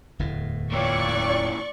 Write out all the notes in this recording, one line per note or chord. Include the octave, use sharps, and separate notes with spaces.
D1 E2 A2
A#2 E3 F4 C#5 D5 G5 C#6